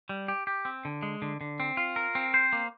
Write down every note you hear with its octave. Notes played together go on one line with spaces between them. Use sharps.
G3
G4
G4
C4
D3
G#3
D3
D3
C4
F4
A#4
C4
C5
A#3